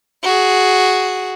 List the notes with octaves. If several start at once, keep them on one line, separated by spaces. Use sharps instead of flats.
F#4 G#4